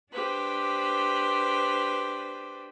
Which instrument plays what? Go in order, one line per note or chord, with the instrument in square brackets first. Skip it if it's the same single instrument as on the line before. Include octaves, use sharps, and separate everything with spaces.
[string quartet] D4 G4 B4 C5